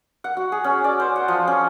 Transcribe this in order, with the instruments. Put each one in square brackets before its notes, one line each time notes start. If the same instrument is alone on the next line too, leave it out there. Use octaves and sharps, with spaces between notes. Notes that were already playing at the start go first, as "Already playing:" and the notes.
[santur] F#5
F#4
G#4
C#4
D5
C5
F#5
F3
C#4